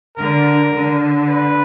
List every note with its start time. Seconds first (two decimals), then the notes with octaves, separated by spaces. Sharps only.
0.18 D3 A#4
0.74 D3
1.29 B4